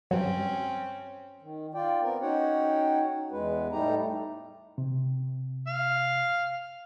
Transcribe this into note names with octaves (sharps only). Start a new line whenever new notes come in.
G2 F#3 C4 C#4
D#3
F4 D5 G5
B3 C4 A#4
C#4 D#4 F#4 C#5 F#5 G5
E2 G#3 B4
A2 G3 A3 D#4 G4 A#5
C3
F5